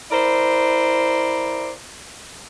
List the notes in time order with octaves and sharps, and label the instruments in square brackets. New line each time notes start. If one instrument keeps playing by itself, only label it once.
[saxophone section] E4 A#4 C5 D5